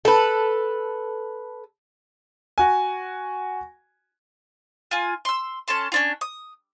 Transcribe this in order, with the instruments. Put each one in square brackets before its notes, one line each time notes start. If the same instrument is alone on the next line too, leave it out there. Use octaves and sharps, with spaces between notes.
[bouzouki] A4 B4
[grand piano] F#4 G#5
[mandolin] F4 G#5
C6 E6
C#4 A4 A5 C6
C#4 D4 F4
D#6